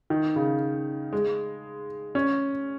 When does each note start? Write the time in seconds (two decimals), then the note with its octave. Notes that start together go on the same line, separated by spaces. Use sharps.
0.10 D#3
0.36 C#3
1.13 G#3
2.15 C#4